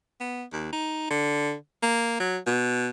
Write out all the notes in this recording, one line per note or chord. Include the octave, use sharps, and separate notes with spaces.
B3
D#2
D#4
D3
A#3
F#3
B2